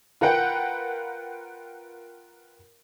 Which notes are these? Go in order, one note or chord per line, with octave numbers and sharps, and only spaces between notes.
F4 A#4 B4 F#5 G5